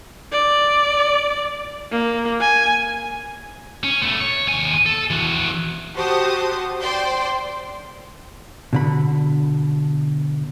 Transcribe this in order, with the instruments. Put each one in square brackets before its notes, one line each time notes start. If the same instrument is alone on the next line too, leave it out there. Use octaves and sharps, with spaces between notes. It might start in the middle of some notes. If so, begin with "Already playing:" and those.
[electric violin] D5
A#3
G#5
[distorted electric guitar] C#4
A3 B3
C#5
D#2 G#5
A4
E3 F#4
[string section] F#4 G4 C5 A5 D#6
C5 D5 G5 C6
[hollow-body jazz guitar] B2 D3 B5